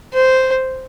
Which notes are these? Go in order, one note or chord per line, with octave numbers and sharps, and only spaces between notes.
C5